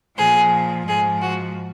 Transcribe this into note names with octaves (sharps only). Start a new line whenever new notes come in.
A#2 F3 G#4
G#2 F3 G#4
F#4